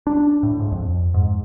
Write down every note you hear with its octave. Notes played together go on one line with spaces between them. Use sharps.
D4
A2
G#2
F2
G#2